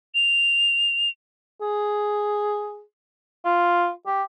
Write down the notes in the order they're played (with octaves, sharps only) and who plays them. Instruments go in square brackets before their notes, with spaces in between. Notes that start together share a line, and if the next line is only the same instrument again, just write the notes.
[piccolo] F7
[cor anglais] G#4
F4
G4